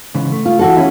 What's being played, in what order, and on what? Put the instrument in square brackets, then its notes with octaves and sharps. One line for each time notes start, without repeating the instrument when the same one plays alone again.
[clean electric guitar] G#2 C#3 E3
A3
[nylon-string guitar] F4
E3 F#4 A4
[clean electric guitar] C#4 E4